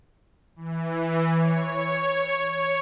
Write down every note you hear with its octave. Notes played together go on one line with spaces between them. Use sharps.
E3
C#5